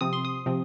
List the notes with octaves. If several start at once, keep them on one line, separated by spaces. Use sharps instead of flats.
C3 F3 C4 D#6
C6
D#6
C3 F3 C4